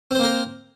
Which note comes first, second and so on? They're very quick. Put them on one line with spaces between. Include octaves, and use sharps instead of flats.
C4 C5 A#3 A#4